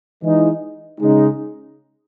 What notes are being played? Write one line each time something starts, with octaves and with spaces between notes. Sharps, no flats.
E3 G#3 D#4
C#3 G#3 D#4